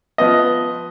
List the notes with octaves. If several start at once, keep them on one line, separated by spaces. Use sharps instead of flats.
F3 B3 D#5